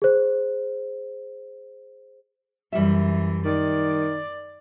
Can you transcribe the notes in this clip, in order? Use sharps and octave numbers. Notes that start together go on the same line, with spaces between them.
G#4 C5
F#2 E3 G3 E5
D#3 D5